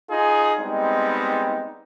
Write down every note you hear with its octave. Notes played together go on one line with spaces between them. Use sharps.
D#4 F4 G#4
G3 G#3 B3 C4 D#4